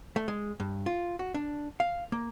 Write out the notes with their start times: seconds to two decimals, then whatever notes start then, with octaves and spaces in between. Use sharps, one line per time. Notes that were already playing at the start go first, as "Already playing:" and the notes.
0.16 A3
0.28 G#3
0.60 G2
0.86 F4
1.19 F#4
1.34 D4
1.80 F5
2.12 A#3